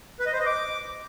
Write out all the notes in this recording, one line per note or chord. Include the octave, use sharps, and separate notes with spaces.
B4
D#5
C5
D#5
D6